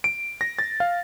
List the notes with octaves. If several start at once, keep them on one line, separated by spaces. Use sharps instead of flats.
D7
A#6
A6
F5